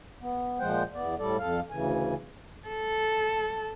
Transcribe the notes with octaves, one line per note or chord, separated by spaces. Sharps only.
B3
A#2 F3 G#3 C5 F#5 G5
E2 B3 D5
A2 G3 A4 D5
F2 A4 F5
D2 C#3 E3 G#5
A4